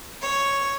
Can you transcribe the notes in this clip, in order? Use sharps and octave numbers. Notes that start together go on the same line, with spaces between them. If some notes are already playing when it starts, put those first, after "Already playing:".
C#5